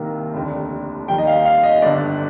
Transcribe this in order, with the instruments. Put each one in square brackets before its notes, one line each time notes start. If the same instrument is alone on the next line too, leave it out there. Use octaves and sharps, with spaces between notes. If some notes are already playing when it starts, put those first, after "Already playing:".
Already playing: [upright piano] C2 C3 D#3 A#3
F1 D#2 D3
D#2 D#3 G3 G5
D#5
F5
F5
D#5
D#5
G1 G2 D3 D5